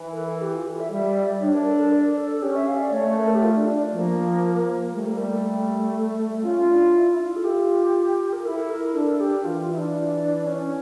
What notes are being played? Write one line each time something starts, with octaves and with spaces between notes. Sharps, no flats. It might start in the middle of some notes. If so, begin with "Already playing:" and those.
Already playing: E3
A#4
A4
G4
F4
A4
E5
G3 E5
D5
D4 C#5
A#4
A4
A#4
D5
A4
A4
C#4 G4
E5
F5
D5
A3 C#5
A#4
A4
G4
F4
D4
D4
F3 A#3
G3 A3
A#3
A3
A3
C#4 F4
D4
E4
E4
F4
A4
F4 G4
A#4
E4 A4
A#4
D4 A4
G4
E3 F4
F4
E4
D4
C#4